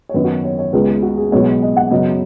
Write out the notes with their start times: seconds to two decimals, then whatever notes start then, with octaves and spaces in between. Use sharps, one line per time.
0.09 C#5
0.14 F#2 D#3 B3 B4
0.24 F#4
0.44 C#5
0.59 C#5
0.73 C#2 C#3 G#3 B3 B4
0.88 G#4
1.02 F#4
1.18 G#4
1.32 B1 B2 G#3 B3 C#5
1.62 D#5
1.77 F#5
1.91 F#2 C#3 F#3 B3 D#5